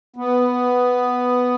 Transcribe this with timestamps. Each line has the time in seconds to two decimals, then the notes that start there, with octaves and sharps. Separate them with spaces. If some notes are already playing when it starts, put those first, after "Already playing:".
0.16 B3